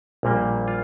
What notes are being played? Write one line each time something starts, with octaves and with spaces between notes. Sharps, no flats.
A#1 A#2 G3 A#3
F4